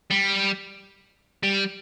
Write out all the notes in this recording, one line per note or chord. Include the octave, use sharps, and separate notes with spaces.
G3
G3